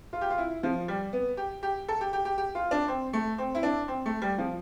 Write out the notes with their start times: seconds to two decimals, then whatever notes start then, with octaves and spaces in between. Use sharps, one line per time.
0.13 F4
0.21 G4
0.30 F4
0.38 E4
0.63 F3
0.88 G3
1.13 B3
1.37 G4
1.63 G4
1.88 A4
2.01 G4
2.13 G4
2.25 G4
2.38 G4
2.55 F4
2.71 D4
2.88 C4
3.13 A3
3.38 C4
3.55 E4
3.63 D4
3.88 C4
4.06 A3
4.22 G3
4.38 F3